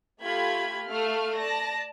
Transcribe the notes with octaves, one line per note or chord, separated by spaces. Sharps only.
A3 F4 G4 B5 G#6
A3 F5 F6
D5 A5 A#6